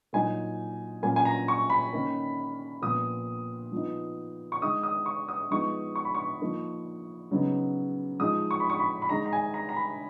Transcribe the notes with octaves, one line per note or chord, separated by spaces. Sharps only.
A#2 F#3 A#3 D#4 G#5
A#2 F#3 A#3 C#4 G#5
G#5
A#5
C#6
B5
D#3 A#3 C#4
A#2 F3 B3 D#6
F3 B3 D#4
C#6
D#3 G#3 D#4 D#6
D#6
C#6
D#6
F3 G#3 B3 D#4 C#6
C#6
B5
C#6
F3 A#3 D#4
C#3 F#3 B3 D#4
F3 G#3 D#4 D#6
C#6
B5
C#6
B5
B5
D#3 G#3 D#4 A#5
A#5
G#5
A#5
A#5
B5